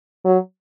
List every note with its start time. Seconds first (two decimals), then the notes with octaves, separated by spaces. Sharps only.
0.25 F#3